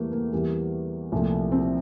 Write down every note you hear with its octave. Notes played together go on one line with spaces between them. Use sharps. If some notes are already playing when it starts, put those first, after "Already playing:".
Already playing: E2 E3 G3 A3 A#3
A#3
E2 E3 G3 A#3
C2 A#2 F3 A3
C4